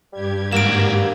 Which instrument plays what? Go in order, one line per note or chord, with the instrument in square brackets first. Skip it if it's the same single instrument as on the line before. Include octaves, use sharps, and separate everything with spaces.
[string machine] G2 G4 G#6 [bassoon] G3
[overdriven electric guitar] G#2 F#4 [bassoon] A#3 [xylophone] D7 E7